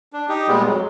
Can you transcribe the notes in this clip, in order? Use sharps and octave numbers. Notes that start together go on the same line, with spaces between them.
D4
D#4 G4
A#2 G3 G#3 B3
F2 F#3 G#3